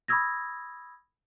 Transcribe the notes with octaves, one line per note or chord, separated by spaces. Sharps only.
B5 C#6 D#6 E6 G#6 A#6